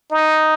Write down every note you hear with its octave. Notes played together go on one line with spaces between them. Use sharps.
D#4